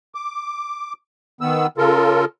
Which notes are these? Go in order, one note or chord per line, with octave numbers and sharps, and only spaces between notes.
D6
D#3 B3 E6
C#3 F4 A4 A#4